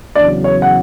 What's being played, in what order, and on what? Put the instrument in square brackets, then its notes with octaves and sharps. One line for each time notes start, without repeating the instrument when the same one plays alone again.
[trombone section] E2 C#3 F#3 [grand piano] D4 D5
[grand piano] C#5
F#5